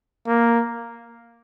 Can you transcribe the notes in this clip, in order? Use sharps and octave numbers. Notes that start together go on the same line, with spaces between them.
A#3